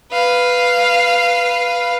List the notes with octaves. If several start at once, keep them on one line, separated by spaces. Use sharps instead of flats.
B4 F5